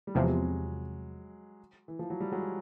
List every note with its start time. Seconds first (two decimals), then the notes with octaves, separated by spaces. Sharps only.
0.07 G3
0.15 E2 C3 F3 F#3 G#3
1.88 E3
1.99 F3
2.10 F#3
2.20 G3
2.32 F#3 G#3